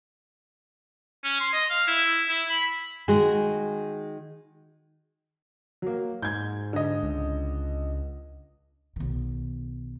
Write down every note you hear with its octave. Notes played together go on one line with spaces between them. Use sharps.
C#4
C6
D#5
F5
E4
E4
B5
D#3 G#3 F#4 G#4
F#3 A#3
G#2 G6 G#6
D3 D#5
C#2
B1 D#3